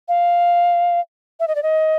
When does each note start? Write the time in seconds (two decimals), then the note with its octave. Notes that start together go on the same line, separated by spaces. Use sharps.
0.08 F5
1.40 E5
1.48 D#5
1.55 D5
1.63 D#5